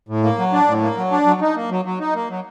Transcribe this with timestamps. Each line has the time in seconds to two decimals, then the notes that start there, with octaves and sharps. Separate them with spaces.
0.09 A2
0.23 A#3
0.38 F#3
0.53 D4
0.68 A2
0.82 A#3
0.97 F#3
1.12 D4
1.26 F#3
1.41 D#4
1.56 A#3
1.70 F#3
1.85 F#3
2.00 D#4
2.15 A#3
2.29 F#3